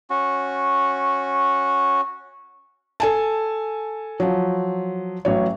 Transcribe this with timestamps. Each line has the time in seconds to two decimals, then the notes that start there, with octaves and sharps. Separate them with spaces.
0.10 C#4 F#4
3.00 A4 G#5 A5
4.20 F3 F#3
5.25 A1 F#3 C#5